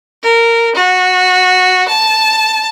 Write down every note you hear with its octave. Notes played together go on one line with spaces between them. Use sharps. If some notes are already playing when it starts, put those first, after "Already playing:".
A#4
F#4
A5